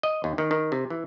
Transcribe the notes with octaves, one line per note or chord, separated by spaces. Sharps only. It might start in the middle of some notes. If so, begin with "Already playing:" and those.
D#5
D#2
D#3
D#3
C3
E3